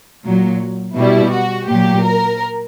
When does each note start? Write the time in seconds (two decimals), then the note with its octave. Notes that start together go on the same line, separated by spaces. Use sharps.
0.25 A#2 F#3
0.97 B2 G3 E4
1.32 F#4
1.68 A#2 F#3 G4
2.04 A#4